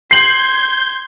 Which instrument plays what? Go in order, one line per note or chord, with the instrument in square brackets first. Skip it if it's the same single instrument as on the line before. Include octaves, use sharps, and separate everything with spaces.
[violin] C6 G#6 [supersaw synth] G6 [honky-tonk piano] C7 F#7